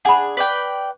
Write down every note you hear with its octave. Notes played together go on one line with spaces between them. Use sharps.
D4 G#4 F#5 B5
B4 D5 G5